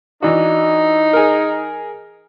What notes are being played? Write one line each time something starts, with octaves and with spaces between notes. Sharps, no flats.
E3 D4 D#4 F#4
G#4 A#4